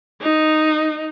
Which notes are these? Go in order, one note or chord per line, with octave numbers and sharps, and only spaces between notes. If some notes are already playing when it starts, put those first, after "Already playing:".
D#4